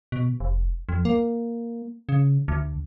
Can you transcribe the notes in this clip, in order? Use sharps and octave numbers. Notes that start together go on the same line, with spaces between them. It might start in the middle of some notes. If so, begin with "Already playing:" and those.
B2
F1
F2
A#3
C#3
D2